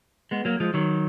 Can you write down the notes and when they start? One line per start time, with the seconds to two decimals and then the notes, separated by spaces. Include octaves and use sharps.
0.31 G#3 B3
0.45 F#3 A#3
0.60 F3 G#3
0.74 D#3 F#3